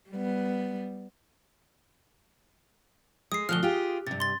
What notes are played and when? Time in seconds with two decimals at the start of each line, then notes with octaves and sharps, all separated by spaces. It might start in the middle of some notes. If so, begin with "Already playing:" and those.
0.10 G3 B3
3.32 G#3 D#6 C7
3.49 D2 B2 F3 F6 F#6 G7
3.63 F4 G4 G#4
4.07 G2 C3 A6
4.20 C6 A6